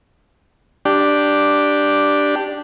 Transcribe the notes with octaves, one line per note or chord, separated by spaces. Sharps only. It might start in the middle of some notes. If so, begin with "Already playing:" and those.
D4 G4